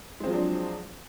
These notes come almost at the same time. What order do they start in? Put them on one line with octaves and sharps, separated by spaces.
G#3 C4 F3 F#3 D4